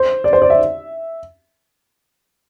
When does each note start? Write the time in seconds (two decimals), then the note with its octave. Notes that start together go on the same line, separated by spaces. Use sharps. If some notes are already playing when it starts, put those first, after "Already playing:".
Already playing: C5
0.24 D5
0.33 C5
0.42 D5
0.50 E5